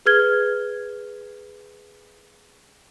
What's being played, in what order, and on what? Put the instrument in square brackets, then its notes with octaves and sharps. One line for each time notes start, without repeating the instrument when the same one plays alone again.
[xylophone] G#4 B4 F6 G#6 G7